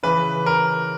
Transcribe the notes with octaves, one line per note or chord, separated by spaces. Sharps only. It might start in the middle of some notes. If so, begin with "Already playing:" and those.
C#3 E3 B4
A#4